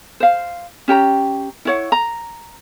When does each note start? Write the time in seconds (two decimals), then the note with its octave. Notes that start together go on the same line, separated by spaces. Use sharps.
0.20 C5 F5
0.88 C#4 G4 G5 A#5
1.65 E4 C#5 F#5
1.92 A#5